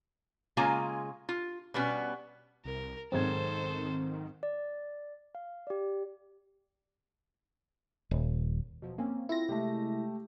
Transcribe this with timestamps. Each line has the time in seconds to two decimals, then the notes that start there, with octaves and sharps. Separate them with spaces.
0.57 C#3 G#3 A#3 F4 G#5 A#5
1.29 F4
1.74 B2 G3 B3 C#4
2.65 C2 A#4
3.12 B1 G#2 D#3 C4 A4 C5 G#6
4.43 D5
5.35 F5
5.67 G4 D5
8.11 D#1
8.82 B2 F3 F#3
8.98 A#3 C4 C#4
9.29 C4 E4 F4 A4 A#6
9.49 C3 G#3 A3 G4